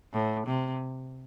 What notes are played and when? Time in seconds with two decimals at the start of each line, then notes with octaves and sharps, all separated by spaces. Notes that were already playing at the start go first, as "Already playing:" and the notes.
0.13 A2
0.47 C3